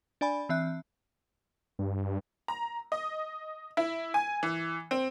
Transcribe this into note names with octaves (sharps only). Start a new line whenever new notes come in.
D4 D5 G#5 B5
E3 C4 E5 F#6
G2
A#5
D#5
E4
G#5
E3
C4